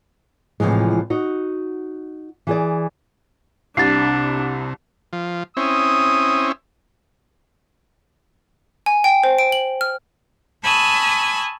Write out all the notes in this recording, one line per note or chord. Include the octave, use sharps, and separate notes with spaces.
A2 C3 E3 F3 G#3
D#4 F#4
E3 G#4 D5
C2 C3 D4 A6 C7
F3
C4 C#4 E4 D#6
G#5
G5
C5
D7
F#7
F6
G#5 A5 B5 C#6 D#6 E6